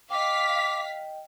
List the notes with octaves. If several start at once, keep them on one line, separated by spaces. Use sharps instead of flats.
D#5 F5 G5 D6 B6